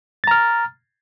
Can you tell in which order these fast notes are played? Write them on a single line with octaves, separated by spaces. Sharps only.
A6 A#5 F6